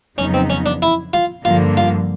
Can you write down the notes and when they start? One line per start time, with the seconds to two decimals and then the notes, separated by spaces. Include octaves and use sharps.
0.18 F2 C#3 F#3 B3 C#4 D#4
0.34 C4
0.50 C#4
0.66 D4
0.82 E4
1.13 F4
1.45 G2 D3 F3 A#3 F4
1.77 F4